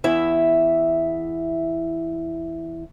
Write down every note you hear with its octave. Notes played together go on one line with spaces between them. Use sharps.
E2 E4 E5